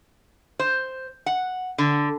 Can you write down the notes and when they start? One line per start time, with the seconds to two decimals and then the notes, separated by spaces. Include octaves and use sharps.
0.59 C5
1.26 F#5
1.78 D3